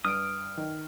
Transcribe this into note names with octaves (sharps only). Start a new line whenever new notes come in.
G2 D#6 F6 D7
D#3